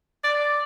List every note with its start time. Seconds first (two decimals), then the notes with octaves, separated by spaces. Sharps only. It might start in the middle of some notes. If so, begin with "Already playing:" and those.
0.24 D5